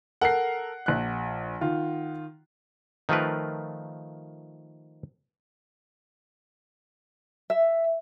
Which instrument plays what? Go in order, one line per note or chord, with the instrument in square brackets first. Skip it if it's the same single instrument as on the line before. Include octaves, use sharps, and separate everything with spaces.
[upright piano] A4 A#4 [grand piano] F#5 C7
[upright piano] A#1 F#6
D#3 F4
[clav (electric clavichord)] D#3 F3 A3 F4 A#4 B4
[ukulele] E5